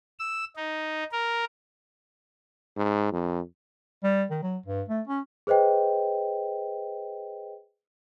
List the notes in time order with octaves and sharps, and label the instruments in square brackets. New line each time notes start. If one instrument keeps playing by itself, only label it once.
[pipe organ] E6
D#4
A#4
[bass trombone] G#2
F2
[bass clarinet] G3
D#3
F#3
G2
A3
C#4
[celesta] G#4 B4 C5 D#5 G5